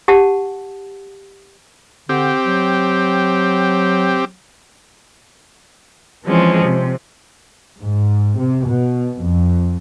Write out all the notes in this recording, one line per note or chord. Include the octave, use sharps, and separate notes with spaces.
G4 F#5 A5
D3 C4 G4
F#3
E3 F3 G#3 C4 C#4
C3
G#2
C3
B2
F2